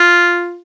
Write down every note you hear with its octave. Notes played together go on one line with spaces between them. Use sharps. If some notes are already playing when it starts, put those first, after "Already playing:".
Already playing: F4